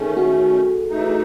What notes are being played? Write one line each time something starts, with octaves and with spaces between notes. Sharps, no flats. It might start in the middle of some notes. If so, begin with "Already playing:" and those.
Already playing: D#3 A3 C#4 G#4 A4
F#4
E3 A3 D#4